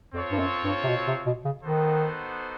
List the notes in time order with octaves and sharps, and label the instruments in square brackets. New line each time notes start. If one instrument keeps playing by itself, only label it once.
[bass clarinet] F2 [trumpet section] C4 F4 A4 C#5
[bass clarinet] G2
F#2
G2
C3
B2
C3
B2
C#3
[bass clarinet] D#3 [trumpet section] B3 D#4 F#4 A4 C5